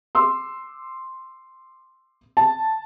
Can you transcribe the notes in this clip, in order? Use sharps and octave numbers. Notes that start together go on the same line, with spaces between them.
C6 D6 E6
A5